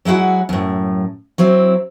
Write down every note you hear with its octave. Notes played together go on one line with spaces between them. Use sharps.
F#3 G#3 E4 F#4 F#5
F#2 A2
F#3 C4 E4